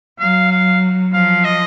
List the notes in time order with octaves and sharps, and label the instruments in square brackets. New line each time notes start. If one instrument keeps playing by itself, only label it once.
[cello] F#3 [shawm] F5
[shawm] F5
[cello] F3 [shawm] F5
[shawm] D#5